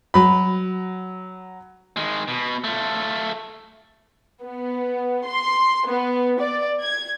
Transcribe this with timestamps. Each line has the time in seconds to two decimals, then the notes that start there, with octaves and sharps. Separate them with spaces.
0.14 F#3 B5
1.96 D#3 G#3
2.28 B2
2.64 A3 F4
4.42 B3
5.26 C6
5.88 B3
6.40 D5
6.82 G#6